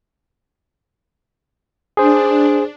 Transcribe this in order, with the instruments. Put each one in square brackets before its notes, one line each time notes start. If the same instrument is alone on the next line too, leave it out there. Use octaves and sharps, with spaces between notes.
[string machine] D4 [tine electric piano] G#4 C5